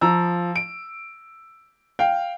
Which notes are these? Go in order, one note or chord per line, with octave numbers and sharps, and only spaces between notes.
F3 A#5 E6
D7
F5 G5